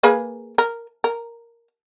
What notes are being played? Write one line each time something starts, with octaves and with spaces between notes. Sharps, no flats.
A#3 G#4 B4
A#4
A#4